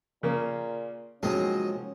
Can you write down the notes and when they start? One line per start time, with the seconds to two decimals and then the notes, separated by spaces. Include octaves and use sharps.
0.23 A#2 C#3 A#3
1.23 D#2 C3 F3 F#3 G#3 C#4 D#5 D#6